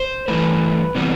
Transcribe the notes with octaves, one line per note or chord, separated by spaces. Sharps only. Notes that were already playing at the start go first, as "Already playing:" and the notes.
Already playing: C5
G2 E3 A3 B4
C3 E3 G3 B3